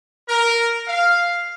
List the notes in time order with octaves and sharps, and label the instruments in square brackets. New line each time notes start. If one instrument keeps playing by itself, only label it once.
[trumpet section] A#4
F5